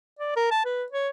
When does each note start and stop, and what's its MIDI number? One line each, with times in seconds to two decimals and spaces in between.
0.19 0.31 74
0.36 0.50 70
0.51 0.63 81
0.65 0.84 71
0.92 1.09 73